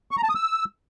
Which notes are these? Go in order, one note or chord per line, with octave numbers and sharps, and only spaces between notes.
C#6
A#5
A5
D#6
E6